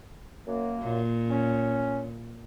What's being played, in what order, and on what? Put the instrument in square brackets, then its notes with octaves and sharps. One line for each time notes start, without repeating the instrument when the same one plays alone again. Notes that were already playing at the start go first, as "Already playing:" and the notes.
[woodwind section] F#2 A#3
[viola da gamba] A#2
[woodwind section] C#4